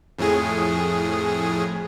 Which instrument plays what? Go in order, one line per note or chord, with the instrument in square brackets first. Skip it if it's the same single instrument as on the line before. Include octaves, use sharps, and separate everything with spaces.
[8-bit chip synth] F2 A2 G#4